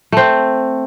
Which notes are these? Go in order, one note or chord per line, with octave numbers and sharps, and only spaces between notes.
A3 C4